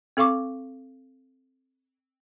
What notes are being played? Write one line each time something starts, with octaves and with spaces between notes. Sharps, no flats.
C4 A4 F5 C#6 D6